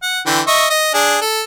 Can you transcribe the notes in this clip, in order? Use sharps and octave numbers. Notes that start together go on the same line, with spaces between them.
F#5
D3 E3 G5
D#5 E5 C#6
D#5
D4 G#4
A4